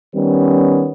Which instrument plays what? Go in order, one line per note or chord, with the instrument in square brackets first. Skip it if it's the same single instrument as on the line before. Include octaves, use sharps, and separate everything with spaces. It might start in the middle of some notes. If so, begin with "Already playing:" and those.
[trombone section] D#3 G3 B3 C#4